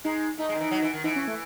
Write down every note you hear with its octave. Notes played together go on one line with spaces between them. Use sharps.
G#3 D#4
A3 D#4
G#3
D#3
E3
F#3
E3
D#3
E3 D#4
C#4
A3